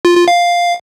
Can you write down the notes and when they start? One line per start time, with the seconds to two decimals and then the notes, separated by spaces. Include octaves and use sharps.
0.05 F4
0.16 F4
0.28 F5